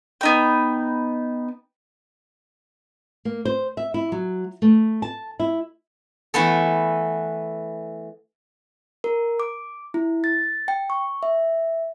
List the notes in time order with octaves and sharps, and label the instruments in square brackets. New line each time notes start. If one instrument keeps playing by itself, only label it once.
[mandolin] B3 D#4 G5
[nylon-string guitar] A#3
C5
E5
E4
F#3
A3
A5
E4
[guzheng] E3 A3 B3 A4
[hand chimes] A#4
D6
E4
A6
G5
C#6
E5